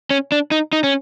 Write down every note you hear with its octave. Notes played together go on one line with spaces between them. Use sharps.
C#4
D4
D#4
D#4
C#4